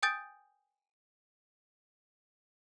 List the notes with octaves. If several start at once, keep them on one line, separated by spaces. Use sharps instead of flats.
G5 G#5 D#6 G6 A6 D7